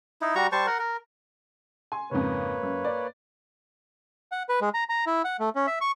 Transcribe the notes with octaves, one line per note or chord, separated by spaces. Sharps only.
D#4 E4
G3 F#4 A#5 C#6
G3 C5 A5 C#6
A#4 F#5
A#4
G#5 C6
F2 G#2 C#3 A#3 B4 C#5
F#2
D5
F#5
B4
G#3
A#5
A#5
E4
F#5
A3
C#4
E5
C#6